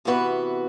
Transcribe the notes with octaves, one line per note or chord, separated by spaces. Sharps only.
C3 E3 B3 F#4 B4